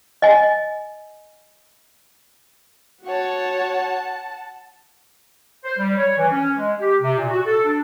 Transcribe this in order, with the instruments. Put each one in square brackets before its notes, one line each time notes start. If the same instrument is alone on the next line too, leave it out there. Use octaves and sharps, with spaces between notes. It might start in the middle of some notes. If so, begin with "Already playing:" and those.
[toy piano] D#5 G#5
[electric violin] F#4 C#5 [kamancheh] F#5 A5
[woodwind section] C5
G3
C#5
E3
C#4
G#3
G4
C3
A#2
F#4
A4
D4